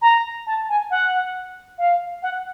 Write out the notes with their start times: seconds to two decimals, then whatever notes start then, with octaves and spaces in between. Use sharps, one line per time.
0.02 A#5
0.46 A5
0.69 G#5
0.90 F#5
1.78 F5
2.22 F#5